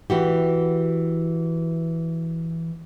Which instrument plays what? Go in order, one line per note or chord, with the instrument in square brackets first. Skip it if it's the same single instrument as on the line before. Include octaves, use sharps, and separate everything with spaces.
[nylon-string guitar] E3 F#4 G4